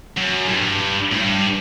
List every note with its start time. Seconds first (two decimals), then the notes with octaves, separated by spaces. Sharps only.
0.17 F#2
0.49 A2
0.56 G2
1.12 A2
1.21 G2